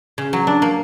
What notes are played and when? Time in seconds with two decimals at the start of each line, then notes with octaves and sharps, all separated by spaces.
0.18 C#3
0.33 F#3
0.47 D4
0.62 A#3